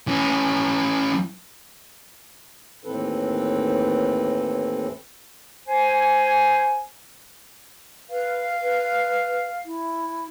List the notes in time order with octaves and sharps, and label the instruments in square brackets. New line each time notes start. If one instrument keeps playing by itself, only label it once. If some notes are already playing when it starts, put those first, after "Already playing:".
[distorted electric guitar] E3 C#4
[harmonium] D#2 A2 E3 C4 A4 B4
[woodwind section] C5 G#5
[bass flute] B4 [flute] F5
[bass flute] B4
E4